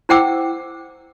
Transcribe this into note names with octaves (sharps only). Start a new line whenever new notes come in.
E4 C5 F#5 G5 D6 E6